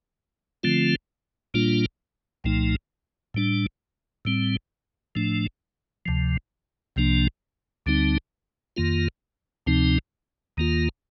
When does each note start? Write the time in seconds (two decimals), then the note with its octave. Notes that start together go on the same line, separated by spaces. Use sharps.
0.63 D3 F3 A3 C4 F4
1.54 A#2 G3 A#3 D4 F4
2.44 C2 A#2 F3 A3 D#4
3.34 A2 G3 D4
4.25 A2 G3 C4
5.15 A2 F3 A3 D4
6.06 D2 C3 F3
6.96 C2 C3 F3 A#3 D4
7.86 D2 D3 G3 C4 D#4
8.76 F2 D#3 A#3 F4
9.67 D2 C3 F3 C4 D#4
10.57 D#2 D#3 A#3 F4